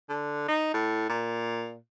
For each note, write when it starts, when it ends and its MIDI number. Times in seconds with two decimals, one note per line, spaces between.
0.09 0.48 50
0.48 0.71 63
0.74 1.06 45
1.09 1.77 46